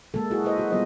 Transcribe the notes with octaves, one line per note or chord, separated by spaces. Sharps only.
G#3 A#3 A4
E4 F#4 G#4
E4 A4 B4 C5 D#5 E5
F#4
G3 B3 F4 F#4 C5 D#5